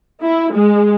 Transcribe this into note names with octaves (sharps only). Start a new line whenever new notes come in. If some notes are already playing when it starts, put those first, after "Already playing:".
E4
G#3